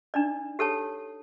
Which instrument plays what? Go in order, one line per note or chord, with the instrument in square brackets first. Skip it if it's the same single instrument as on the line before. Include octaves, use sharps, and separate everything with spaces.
[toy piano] D4 D#4 D5
G4 A4 C#5 A5